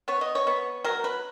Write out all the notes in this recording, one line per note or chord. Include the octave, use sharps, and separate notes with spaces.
B3 C#5
D#5
C#5
B3
F#3 A#4
B4